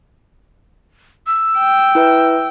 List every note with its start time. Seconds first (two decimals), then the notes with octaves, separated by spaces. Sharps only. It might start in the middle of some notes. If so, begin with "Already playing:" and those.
1.27 E6
1.58 G5
1.95 E4 B4 E5